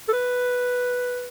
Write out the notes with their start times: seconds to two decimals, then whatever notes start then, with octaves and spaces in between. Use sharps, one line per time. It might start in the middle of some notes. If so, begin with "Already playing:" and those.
0.08 A4
0.13 B4